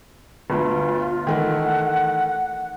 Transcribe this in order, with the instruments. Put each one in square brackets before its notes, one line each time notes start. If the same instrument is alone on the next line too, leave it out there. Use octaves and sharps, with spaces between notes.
[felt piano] G1 D2 [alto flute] F4
[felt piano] D#3 E3 A3 [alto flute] F#5